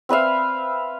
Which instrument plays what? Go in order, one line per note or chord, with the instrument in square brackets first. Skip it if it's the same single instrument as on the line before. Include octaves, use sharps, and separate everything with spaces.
[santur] C4 B4 E5 F5